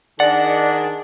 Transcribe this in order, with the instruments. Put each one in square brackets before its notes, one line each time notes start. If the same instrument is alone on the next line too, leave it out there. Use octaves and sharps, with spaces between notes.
[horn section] D#3 D4 [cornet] G#4 [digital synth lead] D5 [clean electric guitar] F#5